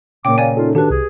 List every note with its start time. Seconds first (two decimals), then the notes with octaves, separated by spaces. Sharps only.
0.25 A#2 C#3 G5 D6
0.38 A#3 C#5 D5 G#5
0.57 C#4 D#4 F4 A4
0.75 D#3 D4 F#4 G4 A4 B4
0.90 C2 G#4